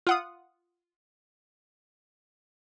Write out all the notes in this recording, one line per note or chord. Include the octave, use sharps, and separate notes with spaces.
F4 F#5 D#6